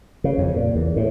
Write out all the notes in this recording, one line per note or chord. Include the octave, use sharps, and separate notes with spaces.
C#3
F2
A#2
E2
A2